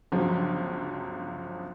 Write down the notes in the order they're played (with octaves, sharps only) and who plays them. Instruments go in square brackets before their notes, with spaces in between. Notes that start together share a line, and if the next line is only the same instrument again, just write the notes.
[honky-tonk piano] G1 C#2 F3 F#3